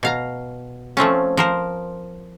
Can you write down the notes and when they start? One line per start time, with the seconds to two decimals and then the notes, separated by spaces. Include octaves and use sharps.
0.03 B2 F5 A#5
0.97 F3 A3 C4 C#4
1.37 F3 A#4 C5